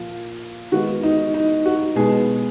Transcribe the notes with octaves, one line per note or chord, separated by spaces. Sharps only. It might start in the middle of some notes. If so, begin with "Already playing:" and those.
Already playing: A#2 F3 A#3 F4
D#3 G#3 B3 F#4
D#4
D#4
F#4
B2 G#3 B3 G#4